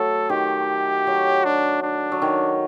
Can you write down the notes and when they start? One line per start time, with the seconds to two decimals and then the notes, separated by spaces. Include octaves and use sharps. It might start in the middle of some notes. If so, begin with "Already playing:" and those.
Already playing: F#3 A3 A4
0.29 D#3 G4
1.07 F#3
1.45 D4
1.83 D4
2.12 F#3
2.22 D#3